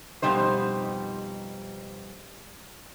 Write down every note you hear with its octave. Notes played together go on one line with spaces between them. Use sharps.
F2 B2 G3 D#4 C5